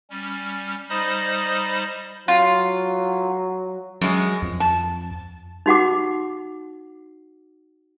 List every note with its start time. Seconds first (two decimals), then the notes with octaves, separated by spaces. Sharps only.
0.10 G3 C#4
0.90 G3 D#4 C5 D#5 B5 D#6
2.28 F#3 F4
4.01 F#2 F#3 G#3
4.42 F2
4.60 A5
5.66 D#4 F#4 F#5 D6